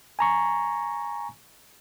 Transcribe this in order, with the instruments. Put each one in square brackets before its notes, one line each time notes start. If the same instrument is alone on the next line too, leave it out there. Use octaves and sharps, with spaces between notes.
[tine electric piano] G#5 A#5 C#6